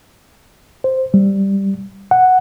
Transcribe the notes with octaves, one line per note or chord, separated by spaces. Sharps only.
C5
G3
F#5